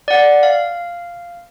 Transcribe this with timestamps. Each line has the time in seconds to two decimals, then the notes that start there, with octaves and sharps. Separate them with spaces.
0.08 D5 F#5
0.43 F5